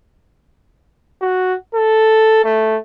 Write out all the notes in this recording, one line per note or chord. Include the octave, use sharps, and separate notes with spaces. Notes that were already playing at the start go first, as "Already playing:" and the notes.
F#4
A4
A3